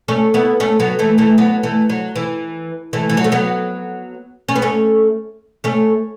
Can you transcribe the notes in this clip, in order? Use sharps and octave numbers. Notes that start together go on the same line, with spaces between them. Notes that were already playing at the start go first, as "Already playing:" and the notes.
A3 C#4
B3 E4
A3 C#4
F#3 B3
E3 A3
E3 A3
F#3 B3
E3 A3
F#3
E3
E3 A3
E3
F#3
A3
F#3 B3
C#4
B3
A3 C#4
A3 C#4